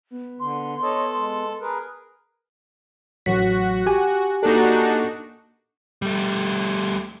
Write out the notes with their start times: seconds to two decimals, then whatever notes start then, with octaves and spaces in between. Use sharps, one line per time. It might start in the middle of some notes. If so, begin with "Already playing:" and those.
0.11 B3
0.40 D3 C6
0.83 A4 C#5 D#5
1.15 G#3
1.60 G#4 A#4 B4
3.26 A1 F#3 F#4 B6
3.86 G4 G#5
4.43 A#3 D4 D#4 F#4 A4
6.02 G3 A3